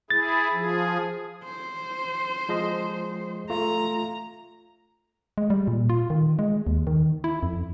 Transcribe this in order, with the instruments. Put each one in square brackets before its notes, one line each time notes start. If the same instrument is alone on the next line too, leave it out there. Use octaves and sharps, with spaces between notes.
[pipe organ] E4 G#4 [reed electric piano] A6
[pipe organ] F3 G#4
[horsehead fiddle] C5
[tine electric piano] F3 G#3 D#5
[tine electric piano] A3 F4 [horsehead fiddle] A#5
[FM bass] G#3
G3
A#2
F4
D#3
G#3
D#2
D#3
E4
F2